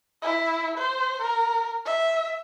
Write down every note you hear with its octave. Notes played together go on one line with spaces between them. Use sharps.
E4
C5
A#4
E5